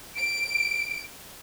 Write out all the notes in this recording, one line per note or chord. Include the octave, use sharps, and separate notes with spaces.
D7